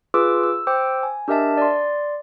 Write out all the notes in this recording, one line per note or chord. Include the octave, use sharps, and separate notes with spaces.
F4 G#4 B4 D6 E6
E6
C5 G5 D6 E6
G#5
D4 G4 A#4 D#5 E5 A5
D5 C6